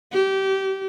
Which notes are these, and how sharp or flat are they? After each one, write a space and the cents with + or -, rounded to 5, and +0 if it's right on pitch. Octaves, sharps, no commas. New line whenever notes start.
G4 -25